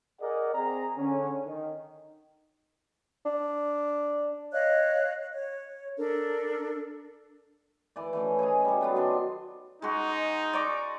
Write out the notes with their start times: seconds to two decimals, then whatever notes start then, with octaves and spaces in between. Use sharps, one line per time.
0.22 G#4 A#4 D5 D#5 F#5
0.55 C4 G#4 A#5
0.97 D3 C#4
1.46 D#3
3.26 D4
4.52 C#5 D#5 F5 F#6
5.34 C#5
5.97 D4 A4 A#4
7.96 E3 D5
8.13 E3 A3 C#4
8.39 G#4 D#5 F5 G#5
8.65 G3 A4
8.81 F#3 B3 F4
8.95 D#3 D4 C6
9.82 G#3 D#4 F#4
10.53 D5 A#5 C#6